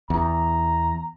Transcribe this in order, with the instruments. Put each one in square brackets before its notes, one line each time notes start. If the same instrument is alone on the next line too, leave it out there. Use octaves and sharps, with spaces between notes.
[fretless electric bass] E2 [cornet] A#5